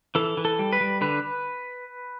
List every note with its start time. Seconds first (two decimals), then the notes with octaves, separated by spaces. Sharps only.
0.15 E3 A4
0.37 E3
0.45 A4
0.59 G3
0.72 B4
0.81 G3
1.01 D3 B4